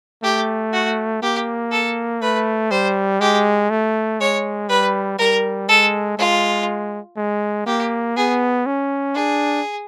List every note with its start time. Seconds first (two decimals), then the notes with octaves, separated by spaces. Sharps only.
0.23 A3 G4
0.73 F#4
1.22 A#3 G4
1.72 A4
2.21 A3 B4
2.71 G3 C5
3.20 G#3 G4
3.70 A3
4.20 G#3 C#5
4.69 G3 B4
5.19 G3 A#4
5.69 G#3 A4
6.18 G#3 F4
7.17 G#3
7.66 A#3 G4
8.16 B3 G#4
8.66 C#4
9.15 D4 G#4